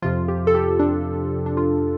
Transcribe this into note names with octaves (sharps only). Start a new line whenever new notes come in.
F2 C3 F3 F4
G4
A4
G4
D4
D4
F4